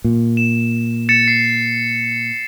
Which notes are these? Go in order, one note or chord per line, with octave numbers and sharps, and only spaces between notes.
A#2
E7
A6 C#7 E7
C7